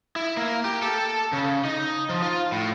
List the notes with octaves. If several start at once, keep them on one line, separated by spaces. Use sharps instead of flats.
E4
A#3
G4
A4
C#3
D#4
F3
F4
A2